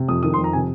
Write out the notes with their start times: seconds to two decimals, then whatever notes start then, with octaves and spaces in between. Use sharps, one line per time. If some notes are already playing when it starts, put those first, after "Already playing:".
Already playing: C3
0.08 F2 D#6
0.23 D#3 D#6
0.34 C6
0.38 F2
0.44 A#5
0.53 C3 G#5